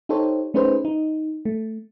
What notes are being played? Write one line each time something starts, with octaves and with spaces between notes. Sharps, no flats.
D#4 G4 A4 C5 C#5
A3 C#4 D#4 G#4 B4 C5
D#4
A3